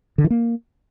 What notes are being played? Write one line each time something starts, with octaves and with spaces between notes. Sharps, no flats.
D3
E3
A#3